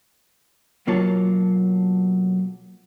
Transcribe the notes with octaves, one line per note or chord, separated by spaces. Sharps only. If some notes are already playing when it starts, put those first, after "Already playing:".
B1 F#3 A#3 F4 C#5 A5